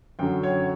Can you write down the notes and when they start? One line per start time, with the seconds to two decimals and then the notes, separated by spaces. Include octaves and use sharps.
0.19 F#2 D3 F#3 G5
0.43 C#5